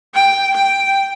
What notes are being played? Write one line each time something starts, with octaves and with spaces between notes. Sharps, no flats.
G5
G5